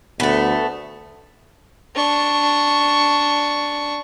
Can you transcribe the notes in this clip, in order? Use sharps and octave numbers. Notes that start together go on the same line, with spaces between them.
D2 A3 B3
D4 C#6